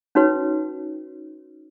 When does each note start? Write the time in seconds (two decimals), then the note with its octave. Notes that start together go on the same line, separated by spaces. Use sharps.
0.15 C#4 D#4 F#4 B4 C#5